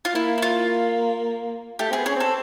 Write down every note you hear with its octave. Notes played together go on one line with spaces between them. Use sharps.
F4
A#3 E4
E4
F4
A3 G4
C4 G#4
B3
C#4 G#4
C4 A4